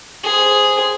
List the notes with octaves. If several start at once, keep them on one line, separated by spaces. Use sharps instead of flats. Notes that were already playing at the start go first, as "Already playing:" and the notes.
G#4 C5